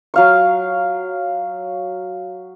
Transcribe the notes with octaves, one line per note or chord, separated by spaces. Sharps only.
F#3 F5 C#6